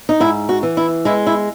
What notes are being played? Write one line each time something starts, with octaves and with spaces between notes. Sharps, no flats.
D#4
G#2 E4
F#4
E3
E4
G#3 E4
E4